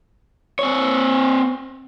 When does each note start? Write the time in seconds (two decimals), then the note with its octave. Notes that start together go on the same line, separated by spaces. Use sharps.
0.59 C4 C#5